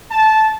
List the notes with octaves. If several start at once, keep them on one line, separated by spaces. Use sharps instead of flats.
A5